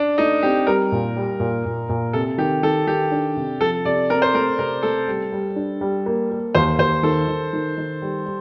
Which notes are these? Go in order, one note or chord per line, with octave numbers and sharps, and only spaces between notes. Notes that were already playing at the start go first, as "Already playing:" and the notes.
Already playing: D4
A3 D#4
C4 G4
G3 A#4
A#2
G3
A#2
A#2
A#2
C3 A4
D#3 G4
D#3 A4
D#3 G4
D4
C3
F3 A4
C3 D5
C4 A#4
C5
A3 A#4
C3 A#4
A3 A4
G3
G3
D4
G3
A#3
A#3
D#2 C5
D#2 C5
D#3 A4
D#3
D#3
D#3
G3
G3